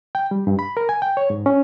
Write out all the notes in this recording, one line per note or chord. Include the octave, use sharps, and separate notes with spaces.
G5
G3
G2
B5
A#4
G#5
G5
C#5
G#2
C#4